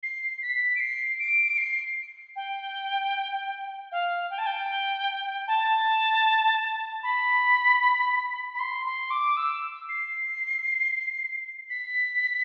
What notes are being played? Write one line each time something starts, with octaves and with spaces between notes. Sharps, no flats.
C7
B6
D7
C7
D7
C7
G5
F5
G5
A5
G5
A5
B5
B5
C6
C6
D6
E6
C7
B6